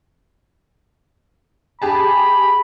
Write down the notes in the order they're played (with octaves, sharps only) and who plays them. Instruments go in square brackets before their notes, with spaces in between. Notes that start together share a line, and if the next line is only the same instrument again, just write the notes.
[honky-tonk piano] G4 G#4 A5 [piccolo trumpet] B5